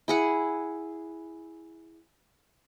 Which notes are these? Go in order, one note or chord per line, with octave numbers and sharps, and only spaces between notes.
E4 G#4 F#5